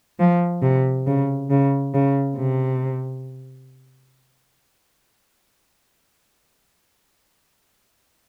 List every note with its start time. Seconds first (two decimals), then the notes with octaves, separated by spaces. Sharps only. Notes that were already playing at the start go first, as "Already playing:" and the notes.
0.19 F3
0.62 C3
1.07 C#3
1.50 C#3
1.94 C#3
2.37 C3